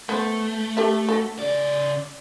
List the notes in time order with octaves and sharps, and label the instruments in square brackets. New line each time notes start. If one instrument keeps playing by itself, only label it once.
[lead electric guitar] A3 [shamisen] B3 C5
[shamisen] G4 A4 E5
F#4 A4
[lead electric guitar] C#3 D5